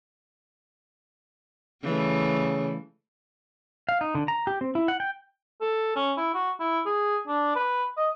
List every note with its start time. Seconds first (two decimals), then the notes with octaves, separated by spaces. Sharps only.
1.84 C#3 E3 G3 A3
3.89 F5
4.01 D#4
4.15 D3
4.28 A#5
4.47 G4
4.61 C4
4.75 E4
4.88 F#5
5.00 G5
5.61 A4
5.96 C#4
6.17 E4
6.34 F#4
6.60 E4
6.86 G#4
7.28 D4
7.56 B4
7.97 D#5